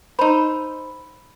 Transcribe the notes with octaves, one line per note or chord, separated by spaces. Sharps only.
D#4 C5 B5 E6